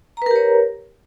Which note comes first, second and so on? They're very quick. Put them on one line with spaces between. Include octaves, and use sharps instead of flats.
A#5 B4 A#4 G4 C#5